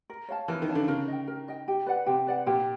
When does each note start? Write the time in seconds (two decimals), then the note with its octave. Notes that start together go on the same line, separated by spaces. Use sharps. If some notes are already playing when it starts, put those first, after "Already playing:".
0.10 A#4
0.28 C#5 F5 A5
0.48 E3 A#4
0.62 D#3
0.69 C#5 F5 A5
0.75 D3
0.88 C#3 A#4
1.08 D#5 G5
1.28 A#4
1.48 D#5 G5
1.68 G4
1.87 B4 D5 F#5
2.06 C3 G4
2.27 B4 D5 F#5
2.46 A#2 G4